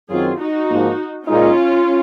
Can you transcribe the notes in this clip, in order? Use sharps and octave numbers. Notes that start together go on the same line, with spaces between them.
F#2 D#3 F#3 C4 F4 F#4 G#4
D#4 F#4
G#2 F3 A#3
A#2 G#3 C#4 D#4 F4